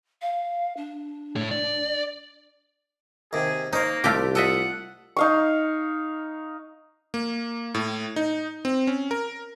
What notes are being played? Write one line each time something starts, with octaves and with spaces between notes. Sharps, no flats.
F5
D4
A2 C#5
D5
D#2 C3 G#4
A#3 D#4 C5 C#5
C2 A3 F4 G4 D6
F4 A4 D#5 E5 F#5
D#4 F5 C#6
A#3
A2
D#4
C4
C#4
A#4